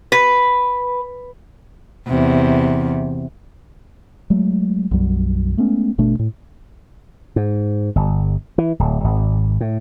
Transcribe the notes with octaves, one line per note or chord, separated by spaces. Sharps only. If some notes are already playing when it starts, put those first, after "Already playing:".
B4
E2 C3
F#3 G#3 A3
B1 F#2 F#3 G3
G#3 A3 B3 C#4
G1 B2 A3 D4
A2
G#2
G1
E3
D1
G#1
A2